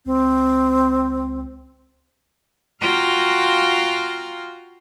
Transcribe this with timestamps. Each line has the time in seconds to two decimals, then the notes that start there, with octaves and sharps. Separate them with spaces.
0.06 C#2 C4
2.81 F4 F#4 F5 G5 A#5 C6